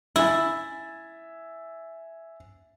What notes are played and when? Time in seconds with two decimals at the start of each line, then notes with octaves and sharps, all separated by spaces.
0.16 E4 E5 G#5 A6